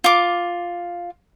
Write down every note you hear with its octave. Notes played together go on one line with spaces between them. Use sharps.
F4 D6